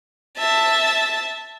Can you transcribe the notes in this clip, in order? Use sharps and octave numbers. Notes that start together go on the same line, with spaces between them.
E5 A5